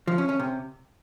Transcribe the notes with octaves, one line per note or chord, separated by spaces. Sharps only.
F3
C#4
C#4
C3